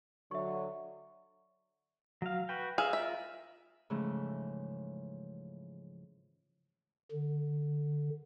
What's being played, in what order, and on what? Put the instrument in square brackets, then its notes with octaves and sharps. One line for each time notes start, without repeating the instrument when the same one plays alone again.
[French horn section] D3 F#3 [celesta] E5 C#6
[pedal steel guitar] F#3 F5
F#4 B4 G5
[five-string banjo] G#4 [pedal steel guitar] E5 F5
[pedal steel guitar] F4 A#4 [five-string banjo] E5
[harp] G#2 C#3 E3 F3 A3
[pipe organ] D3